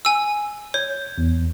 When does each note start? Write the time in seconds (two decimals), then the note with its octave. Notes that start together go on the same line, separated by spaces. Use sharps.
0.05 G#5 E6
0.74 C#5 G6
1.18 E2